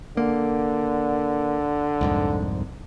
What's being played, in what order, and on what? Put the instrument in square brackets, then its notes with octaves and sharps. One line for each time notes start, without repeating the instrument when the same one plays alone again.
[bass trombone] D3 [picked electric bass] A#3
[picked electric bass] C2 F2 G#2